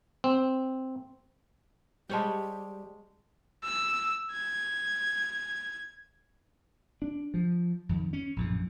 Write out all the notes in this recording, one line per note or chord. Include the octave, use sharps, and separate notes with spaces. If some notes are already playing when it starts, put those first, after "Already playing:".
C4
G3 G#3 G4 C5 C#5 G5 A5
E6
G#6
D4
F3
F2 D#3
C#4
A#1 F#2 A2